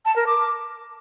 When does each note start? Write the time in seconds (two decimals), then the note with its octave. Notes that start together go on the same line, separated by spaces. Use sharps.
0.05 A5
0.16 A#4
0.27 D6